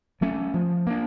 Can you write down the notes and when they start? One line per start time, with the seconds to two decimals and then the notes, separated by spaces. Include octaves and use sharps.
0.21 F#3 A3 C#4
0.54 F3
0.87 A#3 D4